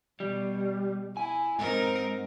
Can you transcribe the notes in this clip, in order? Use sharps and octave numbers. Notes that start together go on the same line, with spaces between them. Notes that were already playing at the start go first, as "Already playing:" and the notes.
B2 G3
E4 G#5
G#2 C4 D#4 A#4